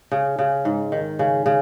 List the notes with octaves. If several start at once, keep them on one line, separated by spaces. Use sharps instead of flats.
C#3
C#3
G#2
D#3
C#3
C#3